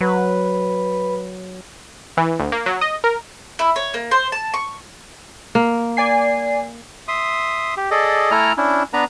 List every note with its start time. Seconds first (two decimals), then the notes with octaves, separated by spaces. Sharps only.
0.01 F#3 B4
2.17 E3
2.39 D2
2.52 A#3
2.66 F#3
2.81 D#5
3.04 A#4
3.59 E4
3.76 C#5
3.94 A#3
4.11 C5
4.32 A5
4.54 C#6
5.55 A#3
5.97 D5 G#5 C7
7.08 E5 C6 D#6
7.77 G4
7.91 G#4 A4 D5 D#5
8.31 A3 E4 A4 G#5 A#5 F6
8.57 C#4 D4 E4
8.93 B3 D4 B4 A#5